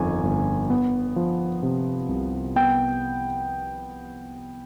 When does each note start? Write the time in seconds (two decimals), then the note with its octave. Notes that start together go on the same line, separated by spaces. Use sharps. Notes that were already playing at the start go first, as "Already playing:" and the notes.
Already playing: G1 F2 D#3 G#5
0.23 G1
0.70 B3
1.16 F3
1.63 C3
2.09 C2
2.56 B3 G5